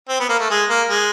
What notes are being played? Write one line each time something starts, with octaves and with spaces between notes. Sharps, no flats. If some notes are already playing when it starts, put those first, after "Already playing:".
C4
B3
A#3
A3
G#3
A#3
G#3